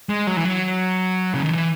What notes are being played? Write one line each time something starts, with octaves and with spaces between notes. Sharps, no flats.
G#3
F#3
E3
F#3
C#3
D#3
E3